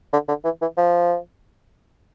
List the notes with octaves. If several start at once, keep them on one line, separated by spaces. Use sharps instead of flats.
D3
D3
E3
E3
F3